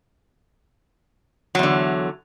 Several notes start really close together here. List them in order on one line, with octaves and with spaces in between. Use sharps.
F#3 E2 D3